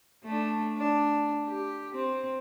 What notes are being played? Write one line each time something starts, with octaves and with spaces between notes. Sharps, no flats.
A3 D4
D4
G4
C4